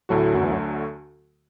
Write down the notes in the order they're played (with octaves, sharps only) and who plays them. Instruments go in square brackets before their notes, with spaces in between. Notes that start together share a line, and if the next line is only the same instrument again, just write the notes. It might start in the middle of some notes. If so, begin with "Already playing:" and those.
[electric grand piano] D2 D3 F#3 A3 F#4 [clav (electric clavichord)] A2
[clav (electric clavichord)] F#2
E2
F#2